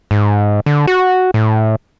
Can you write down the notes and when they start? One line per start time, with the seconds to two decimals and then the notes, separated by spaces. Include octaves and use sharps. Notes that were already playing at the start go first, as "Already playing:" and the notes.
0.11 G#2
0.66 D3
0.87 F#4
1.34 A2